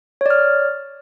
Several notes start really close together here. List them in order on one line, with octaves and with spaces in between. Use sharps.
C#5 D5 F6